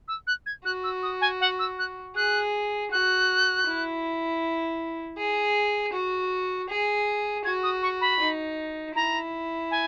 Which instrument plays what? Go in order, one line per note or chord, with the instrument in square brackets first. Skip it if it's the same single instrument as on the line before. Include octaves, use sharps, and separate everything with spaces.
[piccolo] E6
F#6
G#6
[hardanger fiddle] F#4 [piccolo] F#6
[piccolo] E6
D#6
G#5
F#5
E6
F#6
[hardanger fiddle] G#4 [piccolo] F#6
[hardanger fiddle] F#4 [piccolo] F#6
[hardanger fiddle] E4
G#4
F#4
G#4
[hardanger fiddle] F#4 [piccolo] G#6
[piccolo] D#6
C#6
B5
[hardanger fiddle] D#4
[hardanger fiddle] E4 [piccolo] A#5
[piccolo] G#5